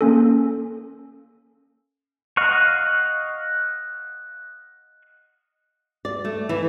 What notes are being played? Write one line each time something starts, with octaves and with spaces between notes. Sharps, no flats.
A#3 C#4 A4
D#5 F5 F#5 C#6
D5
A3
E3